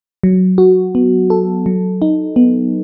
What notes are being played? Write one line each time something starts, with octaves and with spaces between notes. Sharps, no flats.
F#3
F#4
B3
A4
F#3
D#4
B3